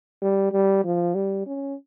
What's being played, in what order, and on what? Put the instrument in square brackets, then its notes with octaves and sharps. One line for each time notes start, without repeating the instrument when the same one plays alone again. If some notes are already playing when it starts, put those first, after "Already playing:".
[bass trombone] G3
G3
F3
G3
C#4